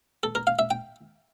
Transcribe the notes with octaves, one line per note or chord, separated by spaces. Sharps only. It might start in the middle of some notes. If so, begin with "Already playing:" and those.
A4
A#4
F5
E5
G5